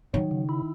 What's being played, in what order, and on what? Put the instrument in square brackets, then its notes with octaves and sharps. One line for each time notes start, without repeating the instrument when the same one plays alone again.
[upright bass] D#3 [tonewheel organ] F#3
[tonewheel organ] C#3
E4